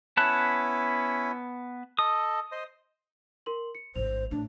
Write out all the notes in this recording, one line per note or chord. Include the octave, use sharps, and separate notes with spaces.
B3 C#4 E4 A5 B5 F#6
A4 D#5 D#6
C5 D#5
A#4 C6 F#7
C#7
A1 G#2 C5 F7
A2 D4